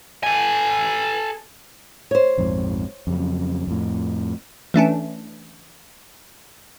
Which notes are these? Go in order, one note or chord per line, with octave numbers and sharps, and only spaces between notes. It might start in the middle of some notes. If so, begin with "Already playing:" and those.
A4 G#5
C5 C#5
A#1 F2 G#2
F2 C#3 F#3
F2 A2
E3 A3 C#4 D4